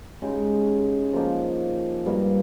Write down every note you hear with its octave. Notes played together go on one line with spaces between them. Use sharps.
C#3 G#3 D#4 G4
F3 A#3 D#4
G2 G3 A#3